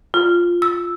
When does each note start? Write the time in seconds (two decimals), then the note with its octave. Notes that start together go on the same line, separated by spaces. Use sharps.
0.14 F4
0.62 E6